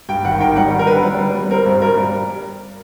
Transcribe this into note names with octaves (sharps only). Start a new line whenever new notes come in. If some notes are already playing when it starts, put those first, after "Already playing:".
G2 G5
G#1 F#5
D#3 G5
G3 F#5
D#3
A#4
D3 B4
G3
G3
G3
C4 A#4
G2
G2 A#4
G3